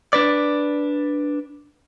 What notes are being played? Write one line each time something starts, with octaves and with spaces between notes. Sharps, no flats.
D4 B4 D5